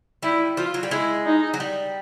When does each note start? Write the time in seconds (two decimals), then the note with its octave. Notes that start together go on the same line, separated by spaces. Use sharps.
0.23 G3 E4
0.57 F3 F4
0.74 F#3
0.83 G3
0.91 G#3 E4
1.26 D#4
1.54 F#3
1.60 G3